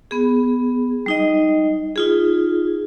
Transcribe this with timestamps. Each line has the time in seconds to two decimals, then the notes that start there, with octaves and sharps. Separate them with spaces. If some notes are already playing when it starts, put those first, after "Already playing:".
0.11 B3 G#4
1.06 G3 D#4 D#5
1.96 D#4 F4 G#4